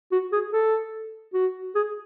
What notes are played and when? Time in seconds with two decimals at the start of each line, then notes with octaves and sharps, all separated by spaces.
0.12 F#4
0.32 G#4
0.53 A4
1.34 F#4
1.75 G#4